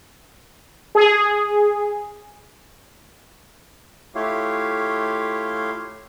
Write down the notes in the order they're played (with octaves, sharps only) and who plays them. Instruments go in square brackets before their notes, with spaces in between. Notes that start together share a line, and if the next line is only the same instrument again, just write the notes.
[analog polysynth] G#4
[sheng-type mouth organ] A3 E4 F4 G4 C#5 F5